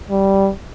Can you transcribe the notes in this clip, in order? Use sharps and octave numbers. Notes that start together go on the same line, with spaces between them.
G3